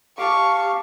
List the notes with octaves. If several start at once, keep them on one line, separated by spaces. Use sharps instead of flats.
G4 F5 A5 C#6 D6